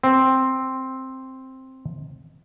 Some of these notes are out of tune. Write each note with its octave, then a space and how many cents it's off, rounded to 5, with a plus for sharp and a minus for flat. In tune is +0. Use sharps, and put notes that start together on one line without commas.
C4 +5